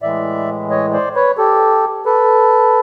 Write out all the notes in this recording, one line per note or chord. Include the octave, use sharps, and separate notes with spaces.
A2 E3 G#3 D5 E5
C#5 D#5
C5 D5
B4 C#5
G4 A4
A4 B4